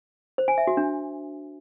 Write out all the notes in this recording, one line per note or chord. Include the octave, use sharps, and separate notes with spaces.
C5
G#5
E5
F#4
D4